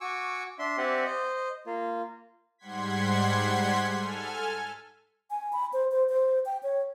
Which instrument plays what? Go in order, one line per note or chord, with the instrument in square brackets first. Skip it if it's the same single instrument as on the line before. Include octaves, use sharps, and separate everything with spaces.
[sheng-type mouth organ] F#4 G#5 C#6 D6 E6
D4 E5 C6
C4 G4 D5 E5 F#5 G#5
C5 D#5
A#3 F4
[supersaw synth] G#2 G3 F#5 C6 G#6 B6
A4 G#5 F6
[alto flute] G#5
B5
C5
C5
C5
G5
C#5